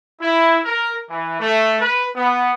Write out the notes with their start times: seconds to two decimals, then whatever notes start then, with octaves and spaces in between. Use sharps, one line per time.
0.21 E4
0.64 A#4
1.10 E3
1.40 A3
1.81 B4
2.15 B3